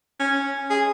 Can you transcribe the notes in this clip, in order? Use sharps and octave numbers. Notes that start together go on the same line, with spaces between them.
C#4
G#4